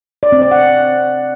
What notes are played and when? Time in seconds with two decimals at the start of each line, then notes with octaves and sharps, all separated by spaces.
0.23 D5
0.32 C4
0.42 D5
0.51 F#5